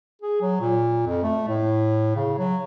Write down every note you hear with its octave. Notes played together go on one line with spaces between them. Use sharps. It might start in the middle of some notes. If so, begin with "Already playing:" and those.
G#4
F#3
A#2
F2
A3
A2
C#3
F#3